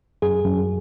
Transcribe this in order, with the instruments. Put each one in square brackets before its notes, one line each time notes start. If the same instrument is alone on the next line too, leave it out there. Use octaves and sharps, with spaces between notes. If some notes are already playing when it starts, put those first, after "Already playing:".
[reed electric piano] F#2 [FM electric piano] G#4
[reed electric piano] F#2